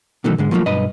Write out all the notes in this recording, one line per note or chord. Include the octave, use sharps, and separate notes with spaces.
B2 D#3 E3 F#3 A3
G#2 D3 G#3
F3 F#3 A3 A#3 F4
B1 G2 B4 D#5